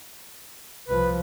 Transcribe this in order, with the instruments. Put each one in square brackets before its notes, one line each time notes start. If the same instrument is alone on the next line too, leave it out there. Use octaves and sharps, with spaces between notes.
[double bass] C2 F3 [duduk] B4